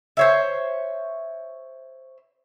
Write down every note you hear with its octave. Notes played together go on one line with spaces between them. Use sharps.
C5 C#5 E5